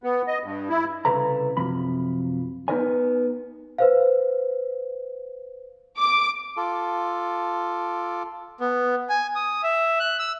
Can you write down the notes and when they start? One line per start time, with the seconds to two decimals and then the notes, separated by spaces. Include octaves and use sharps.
0.03 B3
0.28 D#5
0.44 G2
0.69 E4
1.05 C2 F2 C#3 A4 B4 A#5
1.57 F#2 C3 F3 B5
2.68 B3 D#4 A#4 B4 C#5 G#5
3.78 B4 C5 F5
5.96 D6
6.57 F4 A4 D6
8.60 B3
9.09 G#5
9.36 D#6
9.63 E5
10.00 F#6
10.19 E6